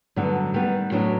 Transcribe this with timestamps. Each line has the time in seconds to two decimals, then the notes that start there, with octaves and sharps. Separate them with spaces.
0.16 G2 D3 F#3 B3
0.54 D#3 G3 B3
0.91 A2 F#3 B3 D4